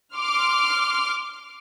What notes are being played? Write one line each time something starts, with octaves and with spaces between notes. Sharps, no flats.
C6 D6 F6